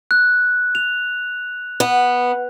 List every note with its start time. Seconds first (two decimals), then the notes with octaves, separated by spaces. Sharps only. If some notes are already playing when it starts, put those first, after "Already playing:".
0.11 F#6
0.75 F7
1.80 B3